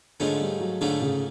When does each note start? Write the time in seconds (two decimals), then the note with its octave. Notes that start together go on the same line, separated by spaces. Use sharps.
0.20 G#2 D3 F3 A3 C#4
0.41 G3
0.60 F#3
0.81 G#2 D3 F3 A3 C#4
1.02 C#3